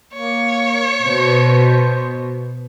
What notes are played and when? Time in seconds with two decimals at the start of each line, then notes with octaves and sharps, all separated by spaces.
0.14 A#3 C#5
1.03 B2 C5